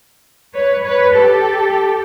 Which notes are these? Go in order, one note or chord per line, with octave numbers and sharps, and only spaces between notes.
B4 C#5
B4 C#5
G4 A4